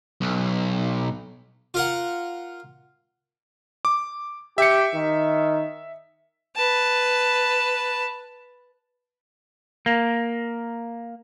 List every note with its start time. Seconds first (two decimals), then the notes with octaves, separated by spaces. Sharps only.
0.21 B1
1.74 F4 A#4 F#5
3.85 D6
4.58 G4 E5 C#7
4.95 D#3
6.56 B4 A5
9.86 A#3